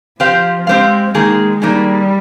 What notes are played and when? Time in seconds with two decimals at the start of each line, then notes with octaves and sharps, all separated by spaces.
0.20 F3 C4 G4 C5 F5
0.67 G#3 C4 G4 C5 F5
1.15 D#3 G#3 A#3 D#4 G#4
1.62 D#3 G3 A#3 D#4 G#4